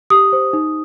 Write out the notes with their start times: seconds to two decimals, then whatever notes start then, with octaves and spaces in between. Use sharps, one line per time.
0.10 G4 D#6
0.33 C5
0.53 D#4